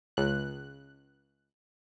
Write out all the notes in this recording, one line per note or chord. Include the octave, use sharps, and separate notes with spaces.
C#2 F#6